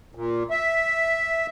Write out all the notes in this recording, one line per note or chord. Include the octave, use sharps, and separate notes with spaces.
A#2
E5